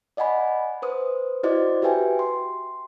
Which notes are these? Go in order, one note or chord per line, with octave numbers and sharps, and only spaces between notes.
D5 D#5 F#5 G#5 B5
B4 C5 D#6
E4 F#4 C5 D5 D#5
F#4 G4 B4 E5 G5 G#5
C6